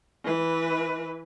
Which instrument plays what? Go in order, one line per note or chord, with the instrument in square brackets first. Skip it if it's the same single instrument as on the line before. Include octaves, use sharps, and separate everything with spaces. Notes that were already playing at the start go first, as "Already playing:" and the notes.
[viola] E3 B4